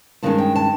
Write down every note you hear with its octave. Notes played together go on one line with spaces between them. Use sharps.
G2 D#3 G#3 C#4 A5
G5
A5